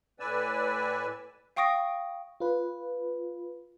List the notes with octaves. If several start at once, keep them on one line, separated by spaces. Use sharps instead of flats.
A2 B4 D5 G#5 E6
F5 G5 C#6 D#6 A#6 D7
F4 B4